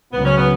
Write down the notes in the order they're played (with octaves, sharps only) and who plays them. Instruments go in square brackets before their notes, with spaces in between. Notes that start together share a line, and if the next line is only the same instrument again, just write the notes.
[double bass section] C#2 C#3 F#3 [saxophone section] B3
[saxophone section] C#4
B3